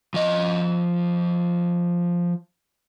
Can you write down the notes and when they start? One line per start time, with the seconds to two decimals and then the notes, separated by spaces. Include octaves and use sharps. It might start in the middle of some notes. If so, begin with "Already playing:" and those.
0.14 F3 D#5